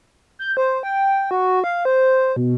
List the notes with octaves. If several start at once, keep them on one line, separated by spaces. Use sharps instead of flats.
G6
C5
G5
F#4
F5
C5
B2